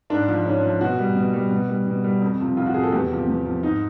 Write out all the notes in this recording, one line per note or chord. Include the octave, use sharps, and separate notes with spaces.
G#2 D4
F3
G#2 C#4
F3
B2 F#4
G3
B2
G3
B2
G3
B2
G3
F2
C3 F3
F2 F4
F#4
C3 F3 G#4
A4
E2 G4
C3 F3
E2
C3 F3
G#2 D#4